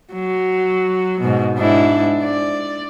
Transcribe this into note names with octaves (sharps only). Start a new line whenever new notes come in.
F#3
G#2 B2
G#2 D4 E4
D5